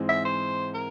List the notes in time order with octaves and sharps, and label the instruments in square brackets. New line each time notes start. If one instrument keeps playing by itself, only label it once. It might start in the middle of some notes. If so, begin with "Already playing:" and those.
Already playing: [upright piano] G#2 E3 G#3 C4
[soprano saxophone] E5
C5
A#4